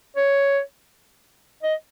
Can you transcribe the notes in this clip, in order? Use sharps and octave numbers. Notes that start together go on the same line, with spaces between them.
C#5
D#5